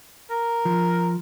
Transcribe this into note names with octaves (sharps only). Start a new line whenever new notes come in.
A#4
F3